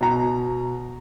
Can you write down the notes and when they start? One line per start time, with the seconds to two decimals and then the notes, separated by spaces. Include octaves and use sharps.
0.01 B2 A#5